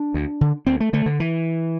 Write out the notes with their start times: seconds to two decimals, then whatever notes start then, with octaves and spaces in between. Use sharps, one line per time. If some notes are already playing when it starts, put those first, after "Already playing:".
Already playing: D4
0.14 D2
0.41 D3
0.67 D2 C4
0.80 A3
0.93 D3 A3
1.06 D3
1.20 E3